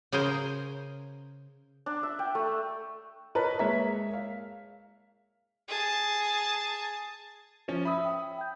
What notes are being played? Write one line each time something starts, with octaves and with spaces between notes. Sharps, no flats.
C#3 G#4 A#4 C5 G#5 A#5
D4
E5
G5
A3
A#4 B4 C#5 D#5 A5 A#5
G#3 A#3 C#5 E5 A#5 B6
F5
G#4 A5
F3 C#4
E5 B5 D#6 E6
G5
G5 G6